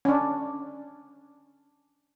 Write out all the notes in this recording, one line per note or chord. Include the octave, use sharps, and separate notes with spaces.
C#4 D4